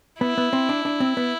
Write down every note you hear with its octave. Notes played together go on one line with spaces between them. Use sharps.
B3 E4
B3
C4
D4
D4
C4
B3